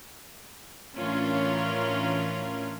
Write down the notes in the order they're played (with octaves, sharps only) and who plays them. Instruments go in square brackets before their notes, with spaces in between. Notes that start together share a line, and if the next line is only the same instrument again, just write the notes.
[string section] A2 E3 C#4 D4 F4 A#4